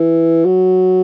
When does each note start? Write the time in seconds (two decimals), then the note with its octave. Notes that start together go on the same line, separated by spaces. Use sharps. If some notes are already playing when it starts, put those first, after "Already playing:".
Already playing: E3
0.45 F#3